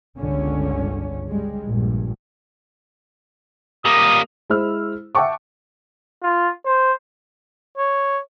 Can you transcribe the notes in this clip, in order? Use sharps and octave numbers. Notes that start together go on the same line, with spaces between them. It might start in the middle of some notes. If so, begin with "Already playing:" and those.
G1 C#2 D3 C#4
G2 G3 G#3
A#1 G2
G3 A#3 D#6
G#3 E4 C5 E6 F6
E5 F#5 G5 A5 C#6 D6
F4
C5
C#5